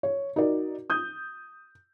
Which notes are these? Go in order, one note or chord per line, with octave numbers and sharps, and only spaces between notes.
C#5
D#4 F#4 A#4 D5
D#6 G6